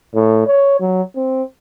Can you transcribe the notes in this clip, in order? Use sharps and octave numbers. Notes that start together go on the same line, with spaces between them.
A2
C#5
F#3
C4